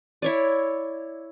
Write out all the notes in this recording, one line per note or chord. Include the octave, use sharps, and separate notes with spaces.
E4 C#5 D5